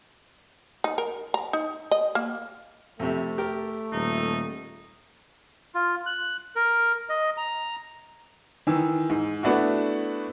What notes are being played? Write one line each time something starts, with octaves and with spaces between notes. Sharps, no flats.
D#4
A#4
A#5
D#4
D#5
A#3
F2 C3 A3
G4 A#4
D#1 D#4
F4
F#6
A#4
D#5
A#5
D#3 E3 E6
G#2
A3 B3 D4 E4 F#4